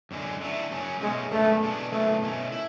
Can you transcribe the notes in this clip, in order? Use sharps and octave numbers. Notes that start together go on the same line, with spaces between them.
F#2 D3 G#3
D3 A3 E4
F#2 C#3 F#3 C#4
B2 G#3 A3 C#4 F#4
F#2 D3 G#3 A3 B3
B2 G#3 D4
F#2 C#3 F#3 A3 B3 E4
B2 A3 C#4
E4